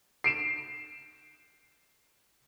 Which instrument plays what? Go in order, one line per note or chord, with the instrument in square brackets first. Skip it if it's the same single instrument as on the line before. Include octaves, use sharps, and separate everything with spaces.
[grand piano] C7 D7 E7